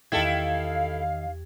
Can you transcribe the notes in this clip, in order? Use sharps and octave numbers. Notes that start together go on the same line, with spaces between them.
E2 D#3 E4 G4 A4 F5 G5 G#6